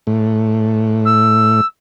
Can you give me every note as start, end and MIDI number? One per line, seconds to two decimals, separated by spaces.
0.07 1.61 45
1.05 1.65 88